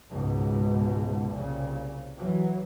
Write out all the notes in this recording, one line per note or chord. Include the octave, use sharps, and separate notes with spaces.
C#2 G#2 B2
C2 A#2 C#3
E3 F#3